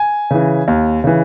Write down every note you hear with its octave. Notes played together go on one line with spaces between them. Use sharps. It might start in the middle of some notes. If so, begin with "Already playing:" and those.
Already playing: G#5
C#3 E3
D#2
C#3 E3